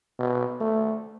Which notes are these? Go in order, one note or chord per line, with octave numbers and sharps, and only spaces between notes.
B2
A3